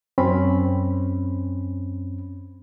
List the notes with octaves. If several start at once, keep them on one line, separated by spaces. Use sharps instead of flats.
F#2 C4 C#4 B5